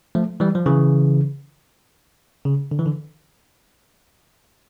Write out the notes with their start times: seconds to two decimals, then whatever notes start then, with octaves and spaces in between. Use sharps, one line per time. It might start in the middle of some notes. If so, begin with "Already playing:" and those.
0.15 F3 A3
0.40 E3 G3
0.55 F3
0.66 C#3 E3
2.46 C#3
2.71 D3
2.79 E3
2.86 D3